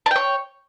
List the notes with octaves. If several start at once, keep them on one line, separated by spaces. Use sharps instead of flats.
C#5 G5 A5